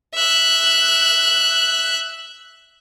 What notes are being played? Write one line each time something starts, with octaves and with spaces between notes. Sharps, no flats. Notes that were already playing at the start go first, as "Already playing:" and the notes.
E5 F#6